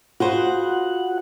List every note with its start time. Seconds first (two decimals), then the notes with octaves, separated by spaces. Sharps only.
0.20 F4 F#4 G#4 C5 F#5